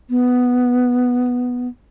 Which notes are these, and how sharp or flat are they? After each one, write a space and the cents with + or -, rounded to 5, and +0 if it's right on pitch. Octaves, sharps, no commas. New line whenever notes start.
B3 +0